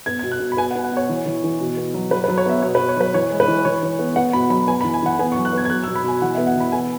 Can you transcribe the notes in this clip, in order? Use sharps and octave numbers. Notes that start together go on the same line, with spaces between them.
B3 G#6
G#6
B2
F#6
B2
B5
B3 G#5
F#5
B3
F#5
B2 C#5
E3
E3
E3
B2
B3
F#3
F#3 B4
B4
F#3
C#5
B3 E5
B2 C#5
B4
B2
C#5
F#3 B4
E3 C#5
G#3
B4
E3
E3 C#5
E3
B3
B3 F#5
B2 B5
F#3 B5
B3 G#5
B5
E3
G#5
E3 F#5
B3 G#5
C#6
F#3
F#6
B3 G#6
G#6
F#3 F#6
E6
B2
B5
B2 G#5
E3 F#5
E5
B3
F#5
E3 B5
B3 G#5